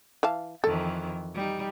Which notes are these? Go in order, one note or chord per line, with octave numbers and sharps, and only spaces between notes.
E3 F5 A5
F2 D#3 E3 A4
G3 D#4